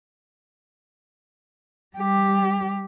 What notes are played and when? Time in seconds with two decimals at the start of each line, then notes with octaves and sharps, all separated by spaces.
1.97 G3 G4